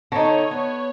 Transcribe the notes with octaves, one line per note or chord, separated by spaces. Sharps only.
D3 D#4 C#5
B3